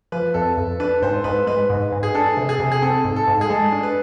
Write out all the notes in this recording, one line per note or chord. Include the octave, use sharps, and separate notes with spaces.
F3 B4
F2 A4
F2
D4 B4
G#2 C5
G#2 B4
G#3 B4
G#2
G#2
G#4
D4 A4
C3
G#4
C3
G#4
C4 A4
G#2
A4
G#2
G#4
G#3 A4
D4
B4